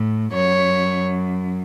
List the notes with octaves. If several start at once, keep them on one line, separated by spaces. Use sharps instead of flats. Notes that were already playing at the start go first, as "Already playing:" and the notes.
Already playing: A2
F#2 C#5